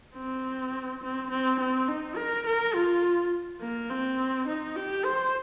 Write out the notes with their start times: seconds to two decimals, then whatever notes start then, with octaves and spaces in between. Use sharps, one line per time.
0.16 C4
1.03 C4
1.31 C4
1.60 C4
1.88 D#4
2.17 A#4
2.46 A#4
2.75 F4
3.61 A#3
3.90 C4
4.47 D#4
4.76 G4
5.05 C5